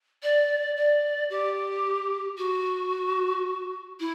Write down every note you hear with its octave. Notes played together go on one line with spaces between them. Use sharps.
D5
D5
G4
F#4
E4